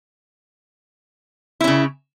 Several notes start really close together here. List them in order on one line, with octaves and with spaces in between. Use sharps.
E4 C#4 C#3